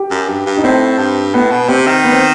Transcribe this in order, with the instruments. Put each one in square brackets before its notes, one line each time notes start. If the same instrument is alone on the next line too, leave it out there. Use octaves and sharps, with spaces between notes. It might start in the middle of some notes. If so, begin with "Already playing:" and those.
Already playing: [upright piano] G4
[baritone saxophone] F#2
G2
G2
[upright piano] D#4
[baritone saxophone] A2 [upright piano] C4
[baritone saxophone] G2
[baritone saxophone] A2 [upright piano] B3
[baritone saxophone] B2
[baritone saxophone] C3 [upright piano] C4
[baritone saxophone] D#3
[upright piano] B3
C4